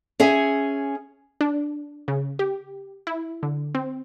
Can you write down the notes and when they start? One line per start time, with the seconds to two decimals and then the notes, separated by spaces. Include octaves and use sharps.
0.20 C#4 G#4 E5 G#5
1.41 D4
2.08 C#3
2.39 G4
3.07 E4
3.43 D3
3.75 C4